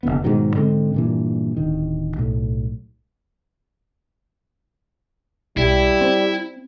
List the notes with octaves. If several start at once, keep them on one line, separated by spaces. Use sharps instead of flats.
F1 E2 D3 B3
G#2 B2 D#3 F#3
G#2 D3 G#3 C4
G2 A#2 E3
D1 D#3
B1 A2
B1 G3 E4
C4